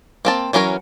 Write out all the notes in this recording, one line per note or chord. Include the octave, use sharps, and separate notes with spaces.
A#3 C4 A5
E3 F#3 C#4 A#4 C#5